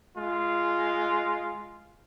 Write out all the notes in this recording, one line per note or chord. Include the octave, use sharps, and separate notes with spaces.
G#3 F4